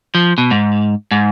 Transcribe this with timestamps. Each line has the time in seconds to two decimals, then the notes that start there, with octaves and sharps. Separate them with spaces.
0.15 F3
0.38 B2
0.51 G#2
1.11 G#2